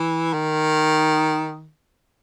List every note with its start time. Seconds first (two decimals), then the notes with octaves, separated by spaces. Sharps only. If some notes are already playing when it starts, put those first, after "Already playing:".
Already playing: E3
0.33 D#3